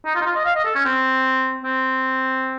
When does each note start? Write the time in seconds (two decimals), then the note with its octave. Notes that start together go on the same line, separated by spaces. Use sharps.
0.06 D#4
0.15 F4
0.21 D#4
0.26 F4
0.35 D#5
0.45 F5
0.55 D#5
0.65 A4
0.75 C#4
0.85 C4
1.64 C4